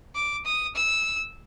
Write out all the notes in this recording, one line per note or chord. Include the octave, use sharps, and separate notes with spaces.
D6
D#6
E6